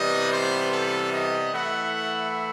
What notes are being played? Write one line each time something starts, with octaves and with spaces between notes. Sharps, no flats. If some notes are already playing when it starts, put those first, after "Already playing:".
Already playing: C3 E3 G3 B3 D#5
C5
A4
D#5
E3 A3 E4 F#5